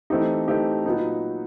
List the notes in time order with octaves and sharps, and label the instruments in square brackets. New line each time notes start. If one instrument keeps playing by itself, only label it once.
[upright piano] E3 A3 C4 D#4 G4
E3 A3 C4 D#4 G4
A#2 F#3 B3 D#4